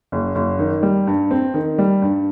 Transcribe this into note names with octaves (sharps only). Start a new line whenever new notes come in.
F#1
F#1
D#3
G3
G2
C4
D#3
G3
G2